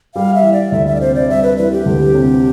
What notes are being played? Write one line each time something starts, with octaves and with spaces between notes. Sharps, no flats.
G3 F5
E5
E3
D5
D2 E5
E5
D5
C3 C5
D5
G3 E5
B4
E3 B4
G4
D2
C3